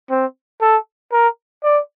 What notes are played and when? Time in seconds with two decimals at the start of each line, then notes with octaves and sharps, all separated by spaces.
0.10 C4
0.62 A4
1.12 A#4
1.64 D5